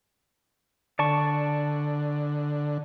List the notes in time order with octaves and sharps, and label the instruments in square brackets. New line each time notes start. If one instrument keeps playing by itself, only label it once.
[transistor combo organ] D3 [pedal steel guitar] D5 A5 C#6